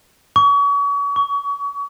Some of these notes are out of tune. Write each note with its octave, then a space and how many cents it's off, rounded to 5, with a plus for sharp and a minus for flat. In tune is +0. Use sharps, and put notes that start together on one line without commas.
C#6 +35
C#6 +25